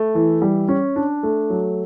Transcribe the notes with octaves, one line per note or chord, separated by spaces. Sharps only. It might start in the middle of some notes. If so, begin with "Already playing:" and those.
Already playing: A3
E3
G3
C#4
D4
A3
F#3